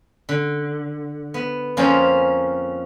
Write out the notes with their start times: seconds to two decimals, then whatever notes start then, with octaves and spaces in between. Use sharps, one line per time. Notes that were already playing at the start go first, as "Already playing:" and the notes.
0.29 D3
1.34 B3
1.77 F2 F3 A#3 C#4 C5 G#5